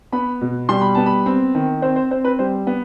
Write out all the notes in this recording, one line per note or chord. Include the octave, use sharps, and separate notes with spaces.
B3 B5
B2
G3 C6
B5
B3 A5
B5
C4
D#3
C4 C5
C5
C4 C5
B4
G3 C5
B3